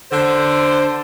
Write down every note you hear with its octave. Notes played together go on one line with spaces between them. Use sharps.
D3 C5